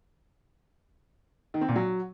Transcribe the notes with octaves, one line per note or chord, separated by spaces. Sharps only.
D#3
C4
A#2
F#3